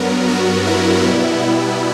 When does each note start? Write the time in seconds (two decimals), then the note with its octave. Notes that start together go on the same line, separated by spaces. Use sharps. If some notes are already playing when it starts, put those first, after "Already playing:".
Already playing: G2 F#3 B3 A#4
0.28 F#4
0.66 E4
1.04 B2 G3 B3